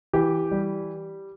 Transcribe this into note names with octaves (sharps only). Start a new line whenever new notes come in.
E3 G4
G3